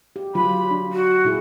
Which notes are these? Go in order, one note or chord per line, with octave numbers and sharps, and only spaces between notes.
G4
D3 F#3 F4 B5
D4
F#4
A#2 E4 G#4